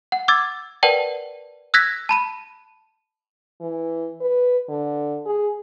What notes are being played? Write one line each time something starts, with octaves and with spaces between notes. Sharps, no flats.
F#5
D6 E6 G#6 A6
A#4 B4 D5 F#5 G5 A5
E6 F#6 G#6 A#6 B6
A5 B5 D#7
E3
B4
D3
G#4